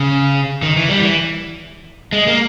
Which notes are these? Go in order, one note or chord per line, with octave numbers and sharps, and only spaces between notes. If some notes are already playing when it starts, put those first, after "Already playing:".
Already playing: C#3
D#3
E3
G3
E3
G#3
A#3